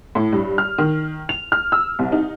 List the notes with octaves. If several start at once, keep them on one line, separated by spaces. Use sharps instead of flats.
A2
G2
F6
D#3
F7
F6
E6
C2
D#4